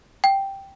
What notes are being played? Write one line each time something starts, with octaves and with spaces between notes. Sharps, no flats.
G5